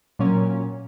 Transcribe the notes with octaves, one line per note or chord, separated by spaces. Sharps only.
A#2 F#3 A#3 C#4